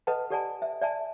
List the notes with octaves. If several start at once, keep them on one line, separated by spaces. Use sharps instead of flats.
A4 B4 D#5 F#5 A5
G4 A4 D5 F#5 G#5 A5
E5
D5 E5 G#5 A5